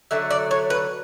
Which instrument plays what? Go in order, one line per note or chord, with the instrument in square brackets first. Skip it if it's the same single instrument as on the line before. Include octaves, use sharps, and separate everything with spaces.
[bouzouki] D3 F#3 A3 E5
D5
C#5
B4